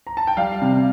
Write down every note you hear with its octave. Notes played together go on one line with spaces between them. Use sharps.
A#5
A5
G5
G3 F5
C3